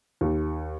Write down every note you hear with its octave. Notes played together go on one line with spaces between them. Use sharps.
D#2